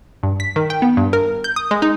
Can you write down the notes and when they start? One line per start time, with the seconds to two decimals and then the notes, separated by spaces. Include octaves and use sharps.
0.23 G2
0.40 B6
0.56 D#3
0.70 G5
0.82 B3
0.97 G2
1.13 A#4
1.44 G6
1.56 D#6
1.71 G#3
1.82 D#4